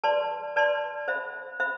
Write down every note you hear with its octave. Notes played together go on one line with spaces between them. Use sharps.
B4 D5 A5 C6
B4 D5 A5 C6
C5 E5 B5
C5 E5 B5